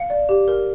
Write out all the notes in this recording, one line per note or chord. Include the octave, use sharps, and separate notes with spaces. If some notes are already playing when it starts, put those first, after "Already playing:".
Already playing: F5 C#7
D5
G4
A#4